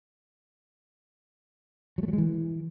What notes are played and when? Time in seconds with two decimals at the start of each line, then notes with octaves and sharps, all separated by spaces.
1.98 F#3
2.03 A3
2.08 F#3
2.13 G#3
2.18 E3